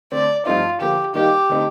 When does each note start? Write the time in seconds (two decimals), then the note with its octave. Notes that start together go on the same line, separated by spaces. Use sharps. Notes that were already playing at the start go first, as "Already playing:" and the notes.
0.12 D3 A3 C4 D5
0.46 G2 F3 A3 C4 D#4 F4
0.80 D3 F3 A#3 G4
1.14 D#3 G3 A#3 D#4 G4
1.49 D3 A3 C4 D#4